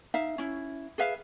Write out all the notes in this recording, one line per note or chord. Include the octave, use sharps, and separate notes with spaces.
D#4 E5 F5
C#4 E4
G#4 B4 E5 F5